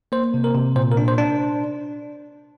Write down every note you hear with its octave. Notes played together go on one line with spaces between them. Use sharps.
A#3 C5
C3
A#4
C3
A#2 C5
A#4
D4
C5
D4